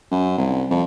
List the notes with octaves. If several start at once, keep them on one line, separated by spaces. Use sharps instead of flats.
F#2
C2
F2